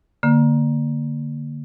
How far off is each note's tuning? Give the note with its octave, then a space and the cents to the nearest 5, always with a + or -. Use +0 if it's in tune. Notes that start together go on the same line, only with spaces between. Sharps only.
D3 +0 A#3 +0